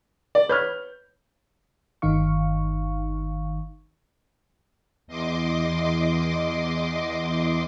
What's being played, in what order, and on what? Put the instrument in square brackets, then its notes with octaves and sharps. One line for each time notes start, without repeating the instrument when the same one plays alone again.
[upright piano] D5
[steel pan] B4 C#5 [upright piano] F6 G6
[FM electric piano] G1 D#3 D#4 F5 C#6
[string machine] E2 D#5 C6 D6